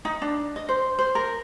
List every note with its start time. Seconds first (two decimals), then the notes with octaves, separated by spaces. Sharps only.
0.05 D#4
0.22 D4
0.56 D#5
0.69 C5
0.99 C5
1.15 A#4